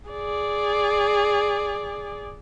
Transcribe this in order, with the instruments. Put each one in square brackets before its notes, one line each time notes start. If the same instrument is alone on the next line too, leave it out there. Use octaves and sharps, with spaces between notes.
[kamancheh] G#4 D5